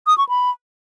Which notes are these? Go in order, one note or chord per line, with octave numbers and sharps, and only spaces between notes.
D#6
C#6
B5